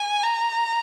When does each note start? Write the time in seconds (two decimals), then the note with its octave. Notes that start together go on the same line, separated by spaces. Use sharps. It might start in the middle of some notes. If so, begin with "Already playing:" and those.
Already playing: G#5
0.23 A#5